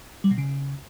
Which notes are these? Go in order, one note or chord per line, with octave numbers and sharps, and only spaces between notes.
G3
B2
C#3